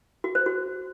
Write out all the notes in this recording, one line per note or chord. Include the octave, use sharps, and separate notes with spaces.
F#4
C5
F#4